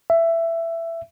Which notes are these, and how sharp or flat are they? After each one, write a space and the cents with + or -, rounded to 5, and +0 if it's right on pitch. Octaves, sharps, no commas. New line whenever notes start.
E5 +15